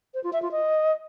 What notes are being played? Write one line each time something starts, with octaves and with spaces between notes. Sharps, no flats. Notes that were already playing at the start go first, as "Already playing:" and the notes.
C5
F4
E5
F4
D#5